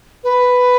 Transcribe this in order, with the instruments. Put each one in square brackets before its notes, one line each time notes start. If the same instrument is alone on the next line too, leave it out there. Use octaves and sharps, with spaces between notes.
[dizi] B4